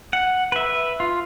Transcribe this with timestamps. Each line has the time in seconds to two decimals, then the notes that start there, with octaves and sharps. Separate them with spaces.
0.13 F#5
0.52 B4 E5
1.00 F4